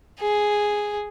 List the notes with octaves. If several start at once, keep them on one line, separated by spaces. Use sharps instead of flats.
G#4